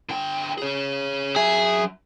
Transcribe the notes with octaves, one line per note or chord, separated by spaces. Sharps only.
D3 G5
G#4 C#5
F#3 G#4 E5